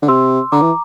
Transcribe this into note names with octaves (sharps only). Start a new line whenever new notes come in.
D3
C3 C6 E6
D3 A#5 D6
E3